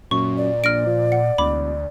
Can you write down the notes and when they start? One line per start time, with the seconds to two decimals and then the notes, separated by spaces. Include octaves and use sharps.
0.11 F#2 A#2 C#6
0.37 D5
0.64 A#1 F6 A#6 D7
0.86 F3
1.12 F#5 C#7
1.38 E1 D2 B5 D6